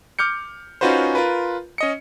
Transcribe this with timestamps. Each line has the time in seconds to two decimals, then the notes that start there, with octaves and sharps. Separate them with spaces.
0.19 D6 F6 G6 C#7
0.81 C#4 D#4 F4 F#4 B4 C5
1.15 F4 A#4 B4
1.78 C#4 D#5 C#7